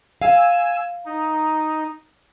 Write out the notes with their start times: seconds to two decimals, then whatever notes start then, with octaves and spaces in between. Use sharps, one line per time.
0.22 F5 G#5 E6
1.05 D#4